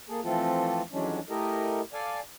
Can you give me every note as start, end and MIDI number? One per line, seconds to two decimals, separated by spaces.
0.09 0.20 58
0.09 0.20 68
0.09 0.20 69
0.24 0.82 52
0.24 0.82 53
0.24 0.82 57
0.24 0.82 60
0.24 0.82 65
0.24 0.82 69
0.92 1.20 41
0.92 1.20 52
0.92 1.20 54
0.92 1.20 56
0.92 1.20 61
0.92 1.20 62
1.29 1.81 57
1.29 1.81 64
1.29 1.81 67
1.29 1.81 69
1.29 1.81 70
1.29 1.81 75
1.93 2.20 69
1.93 2.20 74
1.93 2.20 77
1.93 2.20 80